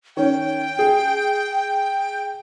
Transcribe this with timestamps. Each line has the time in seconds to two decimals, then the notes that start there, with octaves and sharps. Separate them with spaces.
0.17 D#3 C#4 G5
0.79 G#4